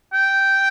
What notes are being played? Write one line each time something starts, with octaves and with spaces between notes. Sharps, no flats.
G5